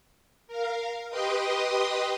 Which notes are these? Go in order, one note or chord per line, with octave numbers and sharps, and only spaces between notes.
A#4 F5
G4 B4 D#5 G5 C6 D#6